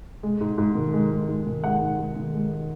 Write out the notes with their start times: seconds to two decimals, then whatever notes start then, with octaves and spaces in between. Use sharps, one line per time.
0.23 G#3
0.41 G#2
0.58 G#2
0.75 D#3
0.93 G#3
1.11 G#2
1.28 G#2
1.46 D#3
1.63 G#3 F#5
1.81 G#2
1.99 G#2
2.16 D#3
2.33 G#3